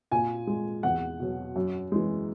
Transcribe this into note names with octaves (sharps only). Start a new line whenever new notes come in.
A#2 G#5
G#3
E2 F#5
B2 F#3
F#2
E3 G#3